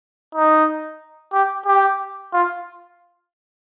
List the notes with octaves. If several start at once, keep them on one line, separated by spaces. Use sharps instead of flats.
D#4
G4
G4
F4